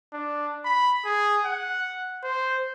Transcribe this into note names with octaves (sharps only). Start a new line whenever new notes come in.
D4
B5
G#4
F#5
C5